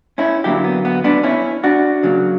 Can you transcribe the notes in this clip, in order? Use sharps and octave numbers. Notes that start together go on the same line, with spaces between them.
C#4 E4
D3 F#3 A#3 E4 G4
B3
B3
B3 D4
C#4 E4
D4 F#4
C#3 F#3 A#3